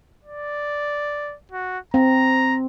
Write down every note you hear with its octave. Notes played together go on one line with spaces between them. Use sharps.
D5
F#4
C4 A#5